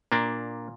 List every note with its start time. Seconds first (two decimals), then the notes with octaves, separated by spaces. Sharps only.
0.12 A#2 A#3 D4